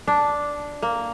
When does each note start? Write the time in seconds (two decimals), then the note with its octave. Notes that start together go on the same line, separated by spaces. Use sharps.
0.07 D4
0.82 A#3